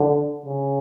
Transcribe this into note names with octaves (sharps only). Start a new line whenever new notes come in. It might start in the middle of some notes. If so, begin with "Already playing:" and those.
Already playing: D3
C#3